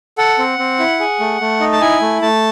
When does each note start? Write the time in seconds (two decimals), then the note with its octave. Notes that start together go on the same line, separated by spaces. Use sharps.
0.18 A4 F#5
0.39 C4
0.59 C4
0.79 E4
1.00 G#4
1.20 A3
1.41 A3
1.60 D#4
1.73 A5
1.81 E4 G#5
2.01 A3
2.22 A3 A5